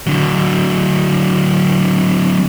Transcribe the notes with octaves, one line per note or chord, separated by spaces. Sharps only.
D3 F#3